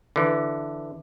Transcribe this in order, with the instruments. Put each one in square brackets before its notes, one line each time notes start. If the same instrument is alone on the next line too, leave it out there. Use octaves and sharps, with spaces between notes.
[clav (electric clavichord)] D3 E3